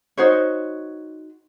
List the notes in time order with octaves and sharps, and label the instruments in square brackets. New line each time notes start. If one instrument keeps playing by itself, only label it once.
[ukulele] D#4 F#4 C5 C#5